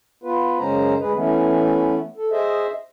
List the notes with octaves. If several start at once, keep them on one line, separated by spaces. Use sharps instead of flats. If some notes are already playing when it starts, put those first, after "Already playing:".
B3 F4 B4
F#2 C#3 G#3 C#4 C5 A#5
D2 G#3 G#4 B4
E3 A3 B3 C#4
A4
G#4 C5 D#5 E5